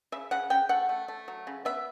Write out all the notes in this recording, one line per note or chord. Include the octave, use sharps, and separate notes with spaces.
C#3 E5
C#3 F#5
C#3 G5
A3 F#5
A3
A3
F#3
C#3
B3 E5